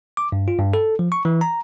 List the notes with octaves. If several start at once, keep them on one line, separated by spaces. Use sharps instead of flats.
D6
G2
F4
G2
A4
F3
C#6
E3
A#5